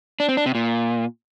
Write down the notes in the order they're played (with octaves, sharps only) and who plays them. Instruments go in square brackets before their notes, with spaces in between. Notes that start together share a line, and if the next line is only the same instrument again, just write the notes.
[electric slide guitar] D4
C4
D4
C3
A#2